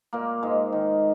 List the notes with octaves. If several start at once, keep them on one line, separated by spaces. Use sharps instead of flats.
A#2 A#3
G#2 G#3
D#3